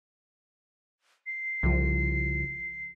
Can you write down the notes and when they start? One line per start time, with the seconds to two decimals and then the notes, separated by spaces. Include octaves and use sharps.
1.26 C7
1.63 C2 C#3 F3